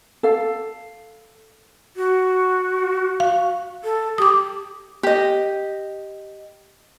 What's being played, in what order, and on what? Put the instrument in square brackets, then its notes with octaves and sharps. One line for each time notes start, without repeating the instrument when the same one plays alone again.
[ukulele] A4 F5
[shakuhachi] F#4
[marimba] F5
[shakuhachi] A4
[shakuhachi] G4 [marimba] D6 D#6
[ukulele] G4 D#5